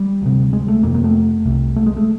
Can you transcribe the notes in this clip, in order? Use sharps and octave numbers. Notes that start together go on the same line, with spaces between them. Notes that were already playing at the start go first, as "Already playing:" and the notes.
Already playing: G3
D2 C3
G#3
A3
F2 C3 A#3
A#3
A3
C2 C3
A3
G#3
A3